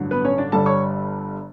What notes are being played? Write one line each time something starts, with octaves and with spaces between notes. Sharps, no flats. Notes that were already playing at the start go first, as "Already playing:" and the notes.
Already playing: A1 G2 D3 F#3
B3 B4
C#4 C#5
D4 D5
G1 G2 D3 G3 A4 A5
C#5 C#6